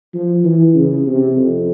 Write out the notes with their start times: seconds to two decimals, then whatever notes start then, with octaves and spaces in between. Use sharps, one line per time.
0.14 F3
0.44 E3
0.75 C#3
1.07 C3
1.37 F2